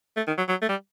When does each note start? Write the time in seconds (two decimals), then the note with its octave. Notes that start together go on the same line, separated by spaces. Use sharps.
0.16 A3
0.27 D#3
0.38 F#3
0.48 F#3
0.62 A3
0.69 G3